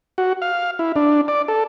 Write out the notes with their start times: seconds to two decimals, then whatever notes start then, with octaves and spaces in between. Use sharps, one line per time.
0.18 F#4
0.42 F5
0.79 E4
0.96 D4
1.28 D5
1.48 A4